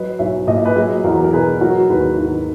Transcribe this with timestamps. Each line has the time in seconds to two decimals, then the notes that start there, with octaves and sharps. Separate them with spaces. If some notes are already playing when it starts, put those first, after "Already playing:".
Already playing: F#3 B4 D#5
0.19 B1 C#5 E5
0.47 A#2 D#5
0.56 E5
0.65 B4 D#5
0.76 F#3 G#4
1.04 E2 F#4 A#4
1.24 A#4
1.33 B2 G#4 B4
1.61 F#3 F#4 A#4
1.89 D#2 G#4 B4
2.18 D#3 F#4